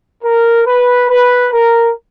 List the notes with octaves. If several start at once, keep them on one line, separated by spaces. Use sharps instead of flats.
A#4
B4
B4
A#4